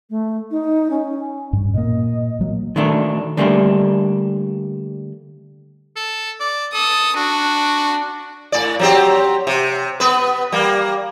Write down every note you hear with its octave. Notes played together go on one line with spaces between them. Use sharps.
A3
D#4
C#4
G2
A#2 A#3 D#5
A#2 F#3 A#3
D#3 F#3 A3 D4
D3 G3 A3 A#3 C4 D4
A4
D5
A4 D#6
D4 F#4
A2 D5
F#3 C4 G4
C3
B3 B4
G3 A#3